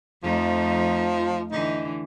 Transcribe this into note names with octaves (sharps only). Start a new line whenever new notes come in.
F2 F3 A3 D#4
D3 E3 D#4